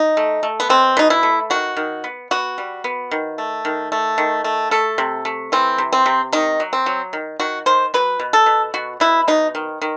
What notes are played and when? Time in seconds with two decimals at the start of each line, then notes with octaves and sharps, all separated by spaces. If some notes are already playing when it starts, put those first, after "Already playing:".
Already playing: D#4
0.17 A3
0.43 A3
0.60 B3
0.69 B2 C4
0.97 B2 D#4
1.10 E4
1.23 A3
1.50 D#3 F#4
1.77 D#3
2.04 B3
2.31 B3 F#4
2.58 G3
2.84 B3
3.11 D#3
3.38 A3
3.65 D#3
3.92 A3
4.18 D#3
4.44 A3
4.71 A3 A4
4.98 C3
5.25 A3
5.52 E3 C4
5.78 C3
5.93 C4
6.06 C3
6.33 D#3 D#4
6.60 F#3
6.73 C4
6.86 F#3
7.13 D#3
7.39 D#3 F#4
7.66 D#3 C5
7.94 F#3 B4
8.20 B2
8.33 A4
8.46 B2
8.74 B2 F#4
9.00 B2 E4
9.28 B2 D#4
9.55 D#3
9.82 D#3